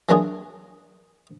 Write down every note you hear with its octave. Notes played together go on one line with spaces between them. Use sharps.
E3 F#3 A#3 D4 F4 G#4